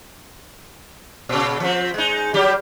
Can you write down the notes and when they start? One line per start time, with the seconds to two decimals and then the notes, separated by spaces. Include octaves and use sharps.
1.29 A#2 C#3
1.60 F3 C4
1.94 G#3 D#4
2.34 F#3 G3 G4